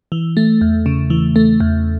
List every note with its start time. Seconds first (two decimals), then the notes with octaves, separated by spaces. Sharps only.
0.12 E3
0.37 A3
0.61 E2
0.86 C#3
1.10 E3
1.36 A3
1.60 E2